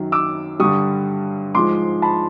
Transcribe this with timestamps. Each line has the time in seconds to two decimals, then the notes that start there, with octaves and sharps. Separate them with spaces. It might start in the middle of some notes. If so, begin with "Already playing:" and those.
Already playing: F#2 D#3 F#3
0.12 D6 E6
0.59 G2 D3 G3 C#6 D#6
1.55 G#2 F3 G#3 C6 D6
2.02 A5 B5